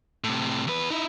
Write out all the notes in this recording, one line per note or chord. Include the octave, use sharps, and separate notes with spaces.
A2 C3
E2 B4
D#4 E4